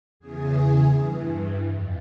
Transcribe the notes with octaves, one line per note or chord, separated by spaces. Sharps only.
E2 C#3 E3 G#4
G2 E3
F2